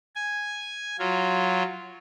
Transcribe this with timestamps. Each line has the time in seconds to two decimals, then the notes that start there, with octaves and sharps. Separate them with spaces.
0.16 G#5
0.99 F#3 F4